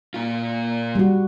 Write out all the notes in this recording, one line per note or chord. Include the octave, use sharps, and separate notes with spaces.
A#2 F4
G3 F#4